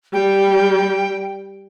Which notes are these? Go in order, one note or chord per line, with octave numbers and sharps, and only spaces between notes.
G3 G5